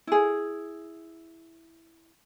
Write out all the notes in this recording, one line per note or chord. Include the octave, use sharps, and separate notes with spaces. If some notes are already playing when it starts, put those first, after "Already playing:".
E4 G#4